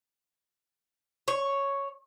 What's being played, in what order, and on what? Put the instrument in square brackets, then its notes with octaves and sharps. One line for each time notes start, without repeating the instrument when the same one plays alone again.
[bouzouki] C#5